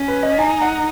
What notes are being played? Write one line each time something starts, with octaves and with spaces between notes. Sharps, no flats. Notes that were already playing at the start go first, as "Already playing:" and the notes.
Already playing: C#4
B4
D#5
D#4 G#5
F#5